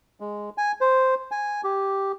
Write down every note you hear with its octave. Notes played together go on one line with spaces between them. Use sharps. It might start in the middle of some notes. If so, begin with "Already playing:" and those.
G#3
G#5
C5
G#5
G4